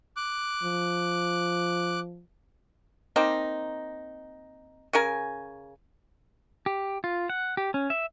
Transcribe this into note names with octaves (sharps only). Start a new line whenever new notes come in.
D6 F#6
F3
A#3 C4 D#4
C#3 C#4 A#4 G#5
G4
F4
F#5
G4
C#4
E5